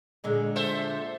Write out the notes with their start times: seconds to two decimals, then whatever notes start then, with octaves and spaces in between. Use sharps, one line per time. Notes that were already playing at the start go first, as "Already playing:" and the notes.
0.24 A#2 D3 G#3
0.56 A4 C5 E5